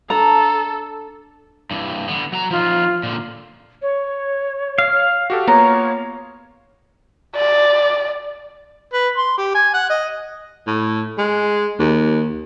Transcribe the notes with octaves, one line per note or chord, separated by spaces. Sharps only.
D4 A4 A#5
G2 E3
D3 B3
F#3 A#5
F3 D#4 F4
A#2 D3
C#5
F5
F#4 G4 A4
A#3 B3 F4 C#5 A#5
D5
B4
C6
G4
G#5
F#5
D#5
A2
G#3
D#2